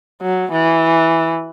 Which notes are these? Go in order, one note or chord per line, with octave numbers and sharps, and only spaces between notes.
F#3
E3